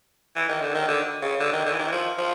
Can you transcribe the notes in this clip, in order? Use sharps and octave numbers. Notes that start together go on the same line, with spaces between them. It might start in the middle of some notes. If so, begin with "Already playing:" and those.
E3
D#3
D3
D#3
D3
C#3
D3
D#3
D3
E3
D#3
E3
F3
F3